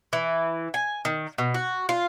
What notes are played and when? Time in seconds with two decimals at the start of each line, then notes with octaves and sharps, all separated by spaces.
0.13 E3
0.74 G#5
1.05 D#3
1.38 B2
1.54 F#4
1.89 F4